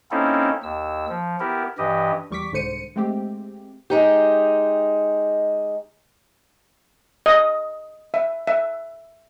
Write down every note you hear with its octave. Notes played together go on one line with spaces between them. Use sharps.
A#3 C4 C#4 D#4 E4 A4
D#2 E6
F3
B3 E4 G4 A#4
G2 E3 G4 D#5
E2 G3 C#6 D6 B6
C2 G#2 D3 C5 C#7 D#7
G#3 A3 C4 G4
G#3 D#4 G4
D#5
E5
E5